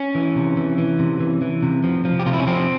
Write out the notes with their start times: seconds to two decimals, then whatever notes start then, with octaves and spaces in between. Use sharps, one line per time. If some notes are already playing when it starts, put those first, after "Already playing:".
Already playing: C#4
0.15 E3
0.36 C3
0.57 E3
0.78 E3
0.99 C3
1.20 E3
1.42 E3
1.62 C3
1.84 F3
2.05 F3
2.19 G4
2.26 C3 F4
2.33 E4
2.40 C#4
2.47 F3 C4